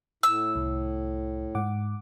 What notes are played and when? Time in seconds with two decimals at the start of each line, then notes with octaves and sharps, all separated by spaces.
0.23 A2 E6
0.56 C2
1.55 G#2 F#5 D6